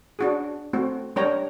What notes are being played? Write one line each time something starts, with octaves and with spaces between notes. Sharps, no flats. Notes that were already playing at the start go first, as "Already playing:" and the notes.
D4 F#4 G#4
A3 C4 F#4
G3 D4 A#4 C#5 G5 A#5